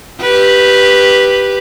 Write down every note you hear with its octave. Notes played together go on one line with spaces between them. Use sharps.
G4 B4